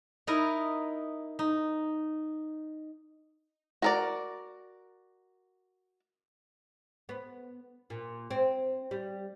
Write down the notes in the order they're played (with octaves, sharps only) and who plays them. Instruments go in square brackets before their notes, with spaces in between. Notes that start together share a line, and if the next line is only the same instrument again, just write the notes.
[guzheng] D#4 E4 A#4 D#5
D#4
[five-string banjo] F#4 A#4 D5
[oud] B3
A#2
C4
G3